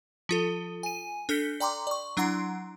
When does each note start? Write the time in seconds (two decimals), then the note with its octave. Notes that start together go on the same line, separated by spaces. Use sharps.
0.29 F3 F4 A4
0.83 G#5 D#7
1.29 D4 A4 F6 G6 B6 C#7
1.60 D5 G5 A#5 C6 D6
1.87 D5 C#6
2.17 F#3 D4 E4 F#5 A#5 C6